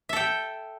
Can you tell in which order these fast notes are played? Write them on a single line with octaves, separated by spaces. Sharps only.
E5 A4 G5